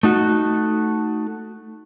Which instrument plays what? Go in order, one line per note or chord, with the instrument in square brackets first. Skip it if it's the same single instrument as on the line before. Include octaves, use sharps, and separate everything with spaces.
[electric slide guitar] A3 D#4 F#4